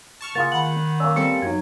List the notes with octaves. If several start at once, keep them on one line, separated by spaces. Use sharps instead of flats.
A5 C#6 F6
C#3 A#3 F4 G#4 A6
D#3 F#5 B5 F#7
A#3 C#4 E6
G3 C4 A4 C#7
F#2 F#3 D#4 G#6